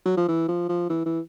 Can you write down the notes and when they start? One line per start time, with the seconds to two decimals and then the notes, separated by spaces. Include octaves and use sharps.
0.05 F#3
0.17 F3
0.28 E3
0.48 F3
0.69 F3
0.90 E3
1.06 E3